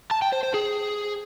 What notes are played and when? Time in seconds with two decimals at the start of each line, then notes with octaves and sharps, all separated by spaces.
0.11 A5
0.22 G5
0.33 C5
0.43 C5
0.54 G#4